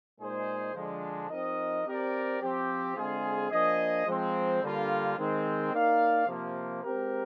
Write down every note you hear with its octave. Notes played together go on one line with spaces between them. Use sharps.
A#2 G#3 D#4 G#4 C5
D3 F3 G#3 D4
F3 C4 D#4 A#4 D#5
C4 G4 A#4 D5
F3 C4 G4
D3 G#3 C4 F4 G#4
F3 A#3 D4 G#4 D#5
F3 G#3 C4
D3 G3 A#3 F4
D#3 G#3 C4
A#3 D#4 A#4 D5 F5
C3 F3 A#3
G#3 C4 G4 A#4